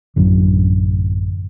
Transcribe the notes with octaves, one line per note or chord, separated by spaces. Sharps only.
A1 F#2 D3